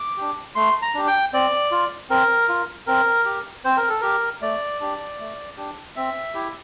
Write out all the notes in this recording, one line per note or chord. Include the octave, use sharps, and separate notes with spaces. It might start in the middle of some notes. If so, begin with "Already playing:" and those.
Already playing: D6
D4 G4
A3 C6
A#5
D4 G4
G5
C4 D5
F4
C4 A#4
F4
C4 A#4
G4
C4 C5
A#4
A4
G4 A#4
A3 D5
D4 G4
A3
D4 G4
C4 E5
E4 G4